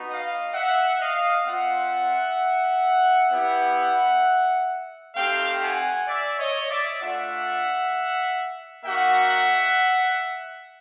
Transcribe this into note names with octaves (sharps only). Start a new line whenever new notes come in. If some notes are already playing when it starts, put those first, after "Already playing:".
Already playing: B3 D#4 F#4
D#5 F5
E5 F#5
D#5 F5
C4 F4 E5 F#5
B3 E4 G4
A3 C4 D#4 G4 F5 G5
F#5 G#5
D5 E5
C#5 D#5
D5 E5
A3 D4 F4 E5 F#5
A#3 D#4 F#4 E5 F#5